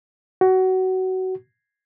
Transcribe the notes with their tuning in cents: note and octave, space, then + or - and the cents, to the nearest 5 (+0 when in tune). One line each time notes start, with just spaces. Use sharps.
F#4 +20